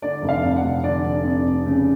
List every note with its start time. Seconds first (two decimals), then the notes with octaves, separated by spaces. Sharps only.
0.02 D3 D5
0.22 F1
0.29 F5
0.43 F2
0.56 F#5
0.63 F1
0.84 D3 D5
1.04 F1
1.24 F2
1.46 F1
1.66 C#3